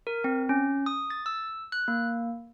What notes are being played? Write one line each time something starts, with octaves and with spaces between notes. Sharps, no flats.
A#4
C4
C#4
D#6
A6
E6
F#6
A#3